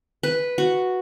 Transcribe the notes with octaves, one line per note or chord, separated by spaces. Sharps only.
B4
F#4